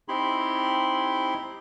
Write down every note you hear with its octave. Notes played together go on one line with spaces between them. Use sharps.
C4 D#4 E4 G4 B5 C6